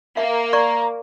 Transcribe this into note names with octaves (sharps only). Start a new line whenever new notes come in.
A#3 E5
D5 A#5 C#6